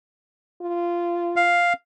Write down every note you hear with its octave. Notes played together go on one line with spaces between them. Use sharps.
F4
F5